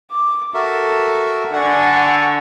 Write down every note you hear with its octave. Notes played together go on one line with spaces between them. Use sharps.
D6
F#4 A4 A#4 E5
D3 F#5 G#5 C#6